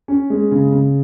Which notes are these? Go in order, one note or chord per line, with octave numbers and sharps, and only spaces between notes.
C#4
G#3
C#3
C#3